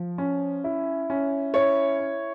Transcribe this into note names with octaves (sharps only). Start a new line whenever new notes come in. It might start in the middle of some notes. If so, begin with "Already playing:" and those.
Already playing: F3
C#4
E4
C#4
E4 C#5
E4